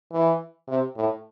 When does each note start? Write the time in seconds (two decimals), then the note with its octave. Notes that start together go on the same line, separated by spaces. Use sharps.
0.12 E3
0.68 C3
0.96 A2